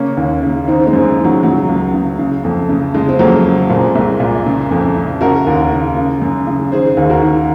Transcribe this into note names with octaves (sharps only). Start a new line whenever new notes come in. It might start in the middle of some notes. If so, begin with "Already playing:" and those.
Already playing: C#3 A#3 C#4
D#2
C#3
D#3 C4 D#4
G#3 C4
F#2
G#3
D#3
F#3
C#3 F#3
C#2
C#3
C#3
F2
C#3
C#3 G#3
C4
F2 F#3 A#3
C#3
A#2 G#3 C4
C2
A#2
C#3
F2
C#3
C#3 F#4 A#4
D#2
C#3
C#3
F#2
C#3
D#3 G#4 C5
D#2
F#4 A#4
D#3